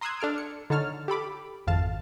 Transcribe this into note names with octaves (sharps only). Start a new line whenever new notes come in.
A#5 C6 D#6 E6 F#6 G#6
D4 A4 F6 D7
C#7
D3 D#4 C#5 A5 F6
G4 A4 B5 D6
G#1 F2 F5 A5